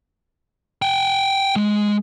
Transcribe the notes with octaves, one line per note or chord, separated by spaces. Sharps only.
F#5 G5
G#3